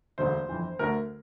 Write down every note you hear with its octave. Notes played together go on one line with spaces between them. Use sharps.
E1 D2 D3 C5
G1 F2 E3
D2 D3 A3 A#4